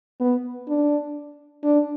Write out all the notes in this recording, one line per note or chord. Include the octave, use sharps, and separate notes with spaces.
B3
D4
D4